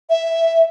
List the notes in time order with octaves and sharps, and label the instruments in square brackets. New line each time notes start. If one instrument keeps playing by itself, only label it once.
[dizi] E5